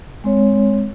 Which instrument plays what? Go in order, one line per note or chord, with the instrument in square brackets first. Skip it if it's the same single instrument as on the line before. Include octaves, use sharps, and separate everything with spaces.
[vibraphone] G#3 C4 C#5